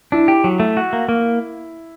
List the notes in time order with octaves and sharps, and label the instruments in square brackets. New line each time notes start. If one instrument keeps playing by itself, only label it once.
[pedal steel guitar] D4 [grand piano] E4
[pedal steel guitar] G4
F#3
A3
F#4
A#3
A#3